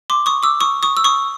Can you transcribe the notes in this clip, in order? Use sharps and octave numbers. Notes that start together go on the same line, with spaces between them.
C6 D6
C#6 D#6
D6 E6
C#6 D#6
C#6 D#6
E6
C#6 D#6